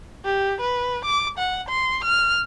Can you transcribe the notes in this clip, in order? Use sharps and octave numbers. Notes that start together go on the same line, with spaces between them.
G4
B4
D6
F#5
C6
F6